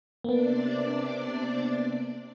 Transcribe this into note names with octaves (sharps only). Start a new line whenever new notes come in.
C3 A#3 B3 D4 D5